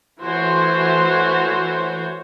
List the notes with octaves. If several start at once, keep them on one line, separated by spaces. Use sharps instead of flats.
E3 A3 F#4 C5 C#5